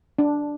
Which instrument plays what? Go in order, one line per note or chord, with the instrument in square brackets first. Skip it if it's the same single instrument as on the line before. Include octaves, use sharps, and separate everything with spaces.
[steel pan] D4